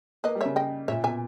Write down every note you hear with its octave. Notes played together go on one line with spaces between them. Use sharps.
A#3 B4 D#5
G3
C#3 C#5 E5
D#5 G5
A#2 C#5 E5
B2 E5 G#5